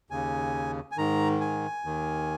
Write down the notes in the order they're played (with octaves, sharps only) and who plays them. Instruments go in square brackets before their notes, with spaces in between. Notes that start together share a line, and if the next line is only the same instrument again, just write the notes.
[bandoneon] D#2 C#3 G#5
G#5
G#2 D#3 A#5
G#5
D#2 D#3